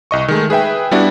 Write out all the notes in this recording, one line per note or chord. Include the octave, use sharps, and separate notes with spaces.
C2 D#5 C#6
D#3 G#3 A3
G#4 B4 E5 G5
G3 B3 D4 E4 F#4